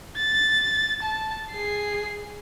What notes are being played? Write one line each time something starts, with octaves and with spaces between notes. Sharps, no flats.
A6
A5
G#4 C7